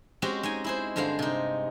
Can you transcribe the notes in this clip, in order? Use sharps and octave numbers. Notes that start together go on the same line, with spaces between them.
G#3 C4 C#4 F#4 G4
G#3 D#4 G#5
E4 G#4 C5
G2 D3 G#3 C5 F5
C3 D#4